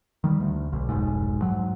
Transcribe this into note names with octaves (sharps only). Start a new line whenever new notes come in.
D#3 G3
D2
B1
F1 B1 G#2
G#2 F#3